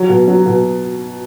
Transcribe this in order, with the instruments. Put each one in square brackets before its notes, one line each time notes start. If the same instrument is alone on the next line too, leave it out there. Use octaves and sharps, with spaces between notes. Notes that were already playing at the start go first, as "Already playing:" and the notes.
Already playing: [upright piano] F#3
B2
F#3
B2